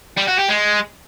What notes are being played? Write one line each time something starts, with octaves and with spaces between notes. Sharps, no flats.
G3
F#4
G4
G#3